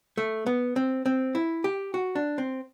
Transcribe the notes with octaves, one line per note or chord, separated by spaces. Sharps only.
A3
B3
C4
C4
E4
G4
F#4
D4
C4